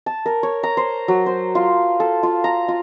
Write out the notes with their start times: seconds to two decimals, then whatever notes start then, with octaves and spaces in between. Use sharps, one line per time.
0.06 A5
0.26 A#4
0.43 C#5
0.63 A#5
0.77 C5
1.08 F#3
1.26 C5
1.55 F4
2.00 A4
2.23 F4
2.44 A#5
2.68 F4